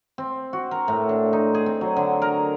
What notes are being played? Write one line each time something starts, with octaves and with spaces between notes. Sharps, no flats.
C4
F#4
A#4
A2
D4
D#4
G#4
C4
F#3
D3
A#4